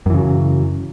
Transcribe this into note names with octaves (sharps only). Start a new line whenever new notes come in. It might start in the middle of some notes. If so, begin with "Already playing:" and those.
F#2 C#3 E3 F#3